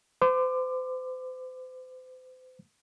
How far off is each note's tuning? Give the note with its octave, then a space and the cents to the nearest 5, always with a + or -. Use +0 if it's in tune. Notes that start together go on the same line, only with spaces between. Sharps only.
C5 -40 D6 +20